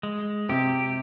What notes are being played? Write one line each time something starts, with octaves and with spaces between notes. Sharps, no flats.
G#3
C3 G4